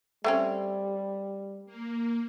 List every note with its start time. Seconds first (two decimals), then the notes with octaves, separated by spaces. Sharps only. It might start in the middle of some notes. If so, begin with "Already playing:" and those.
0.24 G3 A3 C4 C#4
1.66 A#3